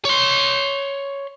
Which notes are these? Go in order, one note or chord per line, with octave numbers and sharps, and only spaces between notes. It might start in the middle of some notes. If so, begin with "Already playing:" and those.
C#5 C6